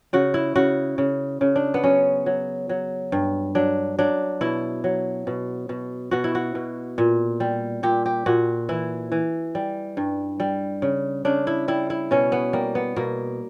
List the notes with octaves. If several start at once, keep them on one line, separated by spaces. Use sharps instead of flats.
C#3 F#4
E4
C#3 F#4
C#3
C#3
D4
B3
F#3 C#4
F#3
F#3
G2
F#3 D4
F#3 D4
B2 E4
F#3
B2
B2
B2 F#4
E4
F#4
B2
A#2
G3
A#2 G4
G4
A#2 F#4
E3 E4
E3
G3
G2
G3
C#3
C#3 D4
E4
G3 E4
E4
B2 C#4
B3
G3 A#3
B3
B2 A#3